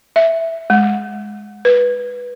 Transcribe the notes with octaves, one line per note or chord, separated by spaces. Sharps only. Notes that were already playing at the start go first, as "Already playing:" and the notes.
E5
G#3
B4